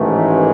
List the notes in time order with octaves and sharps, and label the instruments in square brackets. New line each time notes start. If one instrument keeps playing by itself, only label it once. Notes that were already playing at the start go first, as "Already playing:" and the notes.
Already playing: [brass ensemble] A1 G#2 D#3 A3